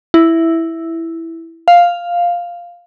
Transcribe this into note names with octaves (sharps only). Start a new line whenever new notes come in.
E4
F5